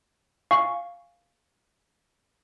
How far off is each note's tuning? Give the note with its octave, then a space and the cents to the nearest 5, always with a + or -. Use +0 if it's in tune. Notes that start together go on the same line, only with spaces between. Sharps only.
F5 +0 G#5 +5 C#6 +0